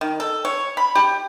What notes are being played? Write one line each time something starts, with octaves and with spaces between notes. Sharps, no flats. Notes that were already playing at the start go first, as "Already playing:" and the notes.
D#3
A4
C#5
B5
G4